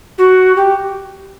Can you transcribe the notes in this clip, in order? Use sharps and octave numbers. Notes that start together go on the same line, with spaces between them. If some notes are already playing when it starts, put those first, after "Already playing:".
F#4
G4